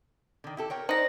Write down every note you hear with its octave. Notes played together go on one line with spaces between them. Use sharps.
D3 D#3
E4 G4 A4
A#4 C#5 G5
D#4 C5 D5 A#6